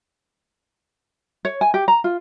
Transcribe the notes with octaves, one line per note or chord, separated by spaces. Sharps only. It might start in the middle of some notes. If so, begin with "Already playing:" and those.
C#5
G#5
G4
A#5
F4